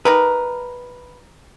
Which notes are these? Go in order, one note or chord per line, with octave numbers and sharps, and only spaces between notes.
D#4 G4 A#4 B4